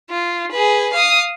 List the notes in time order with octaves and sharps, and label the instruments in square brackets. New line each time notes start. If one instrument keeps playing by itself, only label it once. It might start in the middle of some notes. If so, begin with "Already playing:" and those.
[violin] F4
G#4 B4
F5 D#6